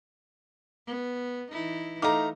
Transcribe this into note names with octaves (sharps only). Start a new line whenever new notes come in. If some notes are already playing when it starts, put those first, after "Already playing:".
B3
E3 D#4 E4
A3 D#4 F5 A#5 D6